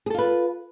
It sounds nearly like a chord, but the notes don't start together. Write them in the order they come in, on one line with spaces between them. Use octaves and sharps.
G#4 A4 F4 B4